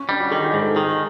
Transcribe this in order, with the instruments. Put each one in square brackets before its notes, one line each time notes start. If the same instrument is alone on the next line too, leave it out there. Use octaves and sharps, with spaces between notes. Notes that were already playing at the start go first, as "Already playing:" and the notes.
Already playing: [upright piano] C#4
[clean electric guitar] G3 [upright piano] D4
[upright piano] F#4
[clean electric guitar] D#3 [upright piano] G#4
[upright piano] G#4
[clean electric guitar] G#2
[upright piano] A4
[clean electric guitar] D#3 [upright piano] G#4